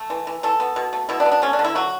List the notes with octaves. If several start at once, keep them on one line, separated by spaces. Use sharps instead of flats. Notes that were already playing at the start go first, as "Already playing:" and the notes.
Already playing: A3
E3
E3
E3 A4
B3
B2
A3
B2 E4
D4
B3
D4
A3 C#4
D4
D3
E4
F#3 F#4